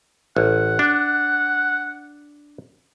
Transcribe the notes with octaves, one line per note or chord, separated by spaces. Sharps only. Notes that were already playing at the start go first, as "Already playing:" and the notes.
A1 F#5
D4